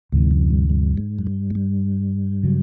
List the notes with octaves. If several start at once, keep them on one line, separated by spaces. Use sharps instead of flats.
D2 G#2 C3 E3
F#2
G2
G2
G#2
F#2
G2
G#2
G2
C#3 F#3